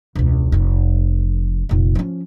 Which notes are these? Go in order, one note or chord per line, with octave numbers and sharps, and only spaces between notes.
E1 C#2
F1 F2
F1 A#2
F3 C#4